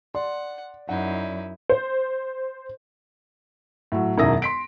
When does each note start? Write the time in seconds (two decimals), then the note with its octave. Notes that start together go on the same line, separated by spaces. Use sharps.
0.15 D5 F#5 C6
0.89 F#2 D#4 E4 F#5
1.69 C5
3.92 A2 F#3
4.17 E1 F#2 D#3 E4 D#6 A#6
4.42 C6 B6 D7